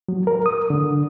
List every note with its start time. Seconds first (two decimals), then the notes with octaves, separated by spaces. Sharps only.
0.09 F#3
0.27 A#4
0.46 D#6
0.70 D3